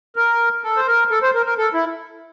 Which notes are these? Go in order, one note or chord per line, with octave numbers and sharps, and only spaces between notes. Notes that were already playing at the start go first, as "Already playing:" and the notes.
A#4
A4
C5
A#4
A4
C5
A#4
A#4
A4
E4